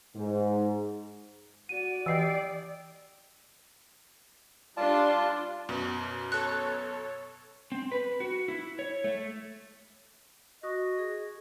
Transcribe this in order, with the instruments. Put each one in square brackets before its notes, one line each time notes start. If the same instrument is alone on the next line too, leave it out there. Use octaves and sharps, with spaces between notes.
[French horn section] G#2
[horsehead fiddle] F#4 D5 [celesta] D#7
[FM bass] E3 [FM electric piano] G4 D#5 G5 [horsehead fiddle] D5 [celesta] E6 C7
[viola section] G3 D4 C6 [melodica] F4 A5 [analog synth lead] D5
[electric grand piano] F#2 B2
[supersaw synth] A4 C#5 [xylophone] F#6
[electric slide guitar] C4
B4
F#4
E4
C#5
A3
[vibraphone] F#4 C#6 D#6 [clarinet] D#5
[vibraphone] G#4